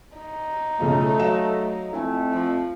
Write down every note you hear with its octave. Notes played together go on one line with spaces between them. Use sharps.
D#4
B1 C#3 F3 A3
F#3 F5 E7
F2 A3 C4 E4 G#5
F3